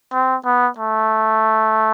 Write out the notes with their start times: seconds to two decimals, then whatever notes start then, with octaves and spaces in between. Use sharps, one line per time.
0.12 C4
0.45 B3
0.78 A3